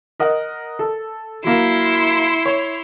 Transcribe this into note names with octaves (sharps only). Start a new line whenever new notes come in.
A#4 D#5 F#5
A4
F#3 A#3 E4 C6
C#5